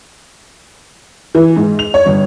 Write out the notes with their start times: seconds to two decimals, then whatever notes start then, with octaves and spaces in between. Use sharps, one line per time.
1.35 E3
1.56 G#2
1.79 F7
1.94 C#5
2.06 G1